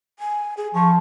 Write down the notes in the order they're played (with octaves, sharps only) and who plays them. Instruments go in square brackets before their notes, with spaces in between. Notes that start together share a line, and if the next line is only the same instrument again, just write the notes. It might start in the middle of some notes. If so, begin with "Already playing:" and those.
[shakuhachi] G#5
G#4
[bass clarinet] F3 [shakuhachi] C#6